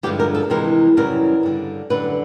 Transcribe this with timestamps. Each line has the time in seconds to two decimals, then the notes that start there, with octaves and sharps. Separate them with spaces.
0.03 G2 D3 F3 G#3 G4
0.20 A#4
0.35 A4
0.50 F2 C3 E3 G#3 A#4
0.97 F#2 C#3 E3 G3 A#4
1.43 G2 D3 G3
1.90 F#2 D3 G3 B4